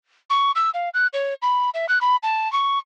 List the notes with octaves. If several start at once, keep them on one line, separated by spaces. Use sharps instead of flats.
C#6
E6
F5
F#6
C#5
B5
E5
F#6
B5
A5
C#6